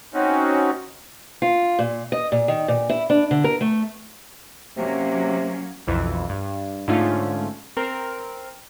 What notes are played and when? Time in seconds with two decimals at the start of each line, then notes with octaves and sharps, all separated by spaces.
0.14 C4 C#4 D#4 F#4
1.42 F4
1.79 A#2
2.12 D#5
2.32 A#2
2.48 D#3
2.68 A#2
2.89 E4
3.10 D4
3.31 D3
3.44 A#4
3.61 A3
4.77 C3 F#3 A#3 C#4
5.87 B1 F2 E3
6.29 G2
6.88 G#2 D3 A3 C#4 F4
7.77 C4 A#4